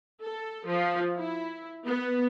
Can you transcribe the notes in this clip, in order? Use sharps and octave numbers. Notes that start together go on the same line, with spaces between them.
A4
F3
E4
B3